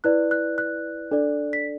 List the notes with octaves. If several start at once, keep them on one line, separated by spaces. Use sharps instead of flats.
E4 B4 D5 F#6
F#6
F#6
D4 A4 D5
B6